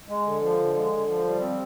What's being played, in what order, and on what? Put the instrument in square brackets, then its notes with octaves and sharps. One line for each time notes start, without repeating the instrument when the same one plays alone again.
[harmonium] G#3
D3
F3
D3
G#3
D3
F3
G3
C4